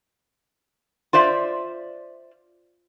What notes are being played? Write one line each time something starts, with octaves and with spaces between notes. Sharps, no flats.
F4 C5 D5 E5